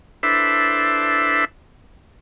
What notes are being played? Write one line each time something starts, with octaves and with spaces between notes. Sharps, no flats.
D4 E4 A4 B4 C5 E5